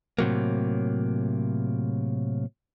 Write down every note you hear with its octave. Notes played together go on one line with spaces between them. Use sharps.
A2 C3 F#3 A#3